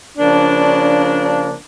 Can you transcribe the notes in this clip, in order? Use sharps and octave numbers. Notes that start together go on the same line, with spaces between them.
C#3 F3 A#3 D4